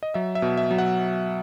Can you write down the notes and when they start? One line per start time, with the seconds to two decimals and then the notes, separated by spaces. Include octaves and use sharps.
0.03 D#5
0.14 F#3 E5
0.35 E5
0.42 B2
0.57 E5
0.71 F#3
0.78 F#5